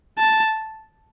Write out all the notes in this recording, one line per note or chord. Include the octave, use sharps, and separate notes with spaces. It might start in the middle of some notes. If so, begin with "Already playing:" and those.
A5